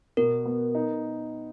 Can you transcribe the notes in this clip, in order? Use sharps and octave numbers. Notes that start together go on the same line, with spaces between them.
B2 A#4
B3
D#4